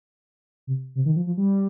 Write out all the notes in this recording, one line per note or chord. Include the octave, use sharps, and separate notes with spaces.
C3
C3
D#3
F3
F3
G3